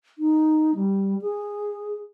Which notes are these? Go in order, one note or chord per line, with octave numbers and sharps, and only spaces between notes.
D#4
G3
G#4